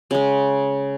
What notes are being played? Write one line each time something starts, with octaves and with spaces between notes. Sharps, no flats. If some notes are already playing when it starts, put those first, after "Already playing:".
C#3 G#3